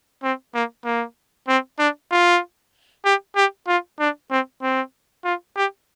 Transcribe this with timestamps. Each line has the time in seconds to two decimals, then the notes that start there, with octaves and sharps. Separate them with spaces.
0.23 C4
0.54 A#3
0.85 A#3
1.48 C4
1.79 D4
2.11 F4
3.05 G4
3.36 G4
3.68 F4
3.99 D4
4.31 C4
4.62 C4
5.24 F4
5.56 G4